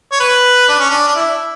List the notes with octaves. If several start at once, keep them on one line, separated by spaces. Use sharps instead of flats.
C#5
B4
D4
C#4
D4
D4
E4